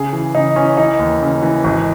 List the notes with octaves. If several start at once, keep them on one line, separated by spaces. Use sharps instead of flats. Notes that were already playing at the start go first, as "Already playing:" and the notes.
Already playing: C#3 G#4
E3
C#3 D#4
E3 C#4
E3 D#4
D#2
C#3
E3
G#1